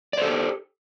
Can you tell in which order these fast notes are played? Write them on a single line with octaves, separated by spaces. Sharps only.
D5 C5 A4 G4